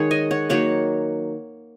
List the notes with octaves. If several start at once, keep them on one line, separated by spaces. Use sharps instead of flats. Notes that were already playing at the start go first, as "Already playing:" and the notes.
Already playing: D#3 G#3 G#4 C#5 F#5
D#5 G#5
C#5 F#5
D#3 F#3 A#3 C#5 F#5